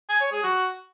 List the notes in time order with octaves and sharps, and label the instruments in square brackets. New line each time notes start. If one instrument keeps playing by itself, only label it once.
[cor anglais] G#5
C#5
G#4
F#4